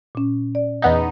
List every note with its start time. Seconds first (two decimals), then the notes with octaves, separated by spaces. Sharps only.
0.15 A#2 C#4
0.55 D5
0.82 E2 B3 D#4